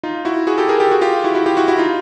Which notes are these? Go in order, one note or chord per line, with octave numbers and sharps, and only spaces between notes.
D#4 F4
E4 F#4
F#4 G#4
G4 A4
G#4 A#4
G4 A4
F#4 G#4
F4 G4
E4 F#4
E4 F#4
F4 G4
E4 F#4
E4 F#4
D#4 F4